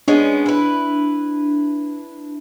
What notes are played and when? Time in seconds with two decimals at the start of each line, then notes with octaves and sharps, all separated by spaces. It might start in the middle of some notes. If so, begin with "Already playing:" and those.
0.08 G#3 B3 C#4 D4
0.46 E4 B4